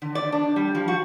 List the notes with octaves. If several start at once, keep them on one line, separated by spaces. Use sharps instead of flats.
D3
D5
D4
G3
F3
F#4